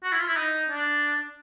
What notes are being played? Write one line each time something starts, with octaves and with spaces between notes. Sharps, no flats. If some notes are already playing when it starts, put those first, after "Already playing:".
F#4
E4
F4
E4
D#4
D4